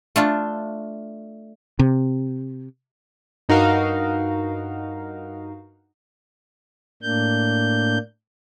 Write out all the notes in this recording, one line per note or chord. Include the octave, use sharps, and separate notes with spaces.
A3 D4 F4
C3
G2 D#4 F#4 A#4 F5
A2 A#3 D4 G6